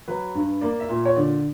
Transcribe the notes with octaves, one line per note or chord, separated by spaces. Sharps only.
F#3 B4
G2
A#3 D5
E5
A#2
C#5
D3 D5